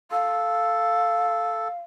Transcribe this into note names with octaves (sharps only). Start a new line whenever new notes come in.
A4 F5